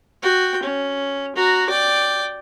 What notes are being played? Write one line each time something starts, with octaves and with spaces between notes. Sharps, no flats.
F#4 G5
C#4
F#4 A#5
D5 G5